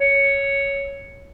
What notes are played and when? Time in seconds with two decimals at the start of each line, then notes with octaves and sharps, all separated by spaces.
0.01 C#5